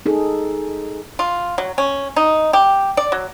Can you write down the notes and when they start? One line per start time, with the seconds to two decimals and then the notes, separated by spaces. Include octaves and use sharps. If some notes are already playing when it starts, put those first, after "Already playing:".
0.06 D#4 G#4 A4
1.19 F4
1.58 F#3
1.78 C#4
2.16 D#4
2.53 G4
2.97 D5
3.12 F#3